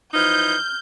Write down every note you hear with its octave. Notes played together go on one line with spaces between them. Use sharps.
E3 F3 D#4 F6 G6